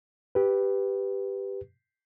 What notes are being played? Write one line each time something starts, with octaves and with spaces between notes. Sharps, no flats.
G4 B4